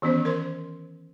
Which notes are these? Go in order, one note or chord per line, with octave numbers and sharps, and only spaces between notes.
D#3 E3 B3 C#4 C5
A#4 C5 C6